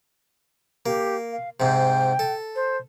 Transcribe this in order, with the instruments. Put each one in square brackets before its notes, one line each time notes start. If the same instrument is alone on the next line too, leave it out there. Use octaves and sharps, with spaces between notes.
[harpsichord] A#3 [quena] G4
[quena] F5
[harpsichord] G#2 C3 [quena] G5
[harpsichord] A4
[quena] C5